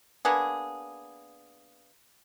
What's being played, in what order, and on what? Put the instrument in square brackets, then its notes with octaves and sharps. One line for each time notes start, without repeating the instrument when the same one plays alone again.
[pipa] A#3 B3 D4 G#4